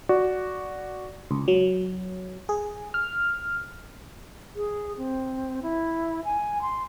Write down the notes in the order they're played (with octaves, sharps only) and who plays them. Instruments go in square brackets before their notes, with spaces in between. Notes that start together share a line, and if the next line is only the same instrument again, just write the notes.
[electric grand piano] F#4 D5
[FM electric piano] C#2
F#3
G#4
F6
[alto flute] G#4
C4
E4
G#5
C6